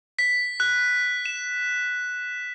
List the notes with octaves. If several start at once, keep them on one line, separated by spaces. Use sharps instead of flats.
B6
F#6
E7